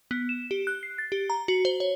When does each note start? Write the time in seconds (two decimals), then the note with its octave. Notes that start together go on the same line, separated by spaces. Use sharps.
0.11 B3
0.29 E7
0.51 G4
0.67 F#6
0.83 C7
0.98 A6
1.12 G4
1.30 A#5
1.48 F#4
1.65 C5
1.80 C#5